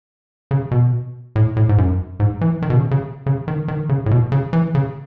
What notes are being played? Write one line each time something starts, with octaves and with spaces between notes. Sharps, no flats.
C#3
B2
A2
A2
G#2
F#2
G#2
E3
D#3
B2
C#3
C#3
C#3
D#3
D#3
C#3
A2
B2
C#3
E3
C#3